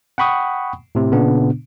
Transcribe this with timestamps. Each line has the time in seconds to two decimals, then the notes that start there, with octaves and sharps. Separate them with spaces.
0.18 F#5 G5 B5 C#6 D#6
0.95 A2 C3
1.12 A#2 C#3 B3 D4